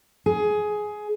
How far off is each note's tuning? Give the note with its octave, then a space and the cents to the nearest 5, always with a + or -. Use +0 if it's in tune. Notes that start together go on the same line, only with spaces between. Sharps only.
G#4 +15